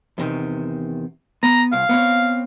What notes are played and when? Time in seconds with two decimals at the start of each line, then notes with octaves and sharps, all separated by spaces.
0.18 E2 C3 D#3
1.43 B3 A#5
1.72 C2 F5
1.89 B3 C4 C#5